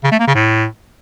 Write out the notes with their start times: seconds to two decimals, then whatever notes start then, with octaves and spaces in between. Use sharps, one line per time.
0.04 C#3
0.12 A3
0.19 A#3
0.27 C#3
0.35 A2